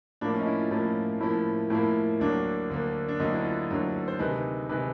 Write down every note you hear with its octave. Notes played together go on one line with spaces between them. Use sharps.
A2 F3 A#3 D4
C#4
D#4
E4
F4
A2 F3 A#3 F4
A2 F3 A#3 E4
A2 F3 A#3 E4
D2 D3 F#3 A#3 D4
D2 D3 F#3 A#3
D4
D2 D3 F#3 A#3 D#4
E4
F4
D2 D3 F#3 A#3
C5
D2 C3 D#3 G#3 B4
C3 D#3 G#3 B4